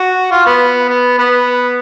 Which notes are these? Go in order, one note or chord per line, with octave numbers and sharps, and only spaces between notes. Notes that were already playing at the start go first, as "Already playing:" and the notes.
Already playing: F#4
F4
B3
B3
B3